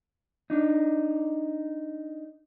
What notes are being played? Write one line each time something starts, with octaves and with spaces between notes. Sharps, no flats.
D4 D#4